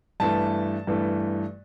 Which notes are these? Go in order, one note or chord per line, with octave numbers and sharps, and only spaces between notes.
G2 E3 A3 A5
G2 E3 A3